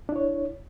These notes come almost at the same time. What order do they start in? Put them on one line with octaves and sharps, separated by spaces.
D4 E4 C#5